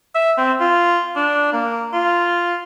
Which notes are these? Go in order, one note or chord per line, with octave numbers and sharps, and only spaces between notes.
E5
C4
F4
D4
A#3
F4